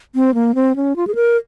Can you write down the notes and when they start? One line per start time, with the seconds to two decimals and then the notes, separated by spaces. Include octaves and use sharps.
0.15 C4
0.34 A#3
0.55 C4
0.76 C#4
0.96 F4
1.07 G#4
1.15 A#4